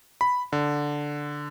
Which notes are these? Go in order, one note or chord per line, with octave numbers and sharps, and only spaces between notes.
B5
D3